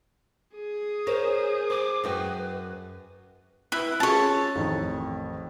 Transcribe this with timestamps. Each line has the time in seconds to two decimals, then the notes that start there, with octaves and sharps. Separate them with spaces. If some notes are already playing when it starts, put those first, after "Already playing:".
0.56 G#4 D#6
1.07 A#4 C5 C#5
1.70 C5 D6
2.04 F#2 F#4 B4 G5
3.72 E4 B4 E6 F#6
4.00 C#4 F4 G#4 C#5 A5
4.55 A1 F2 D#3